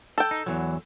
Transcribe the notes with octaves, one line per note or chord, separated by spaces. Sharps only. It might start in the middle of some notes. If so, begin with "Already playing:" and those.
A4 G5
D#4
E2 E3 F#3